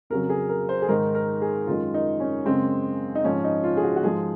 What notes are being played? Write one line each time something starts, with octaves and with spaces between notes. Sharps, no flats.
F2 C#3 F#3 A#4
G#4
A#4
C5
G#4
G#2 D#3 G#3 A#4
A#4
G#4
F#2 D#3 G#3 F4
D#4
C#4
F#2 C#3 G#3 C4
D#4
G#2 F3 G#3 C#4
D#4
F4
G#4
F#4
F#4
G#2 F3 G#3 G#4